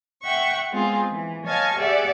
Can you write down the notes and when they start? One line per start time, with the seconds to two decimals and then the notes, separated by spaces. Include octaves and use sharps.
0.23 E5 F#5 G5 C#6
0.72 G#3 B3 C4 F4 G#4
1.10 E3
1.44 C#5 D#5 F5 G#5 A5 C#6
1.77 G4 G#4 D5 E5 F#5